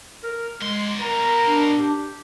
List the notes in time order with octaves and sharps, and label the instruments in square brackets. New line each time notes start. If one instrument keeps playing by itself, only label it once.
[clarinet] A#4
[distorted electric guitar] B2 C6 [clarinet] G#3
[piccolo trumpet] A#4 [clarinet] A#5
[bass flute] D4
[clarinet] G4